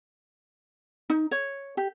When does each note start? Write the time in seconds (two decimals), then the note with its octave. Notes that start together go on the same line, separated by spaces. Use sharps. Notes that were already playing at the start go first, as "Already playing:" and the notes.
1.10 D#4
1.31 C#5
1.77 G4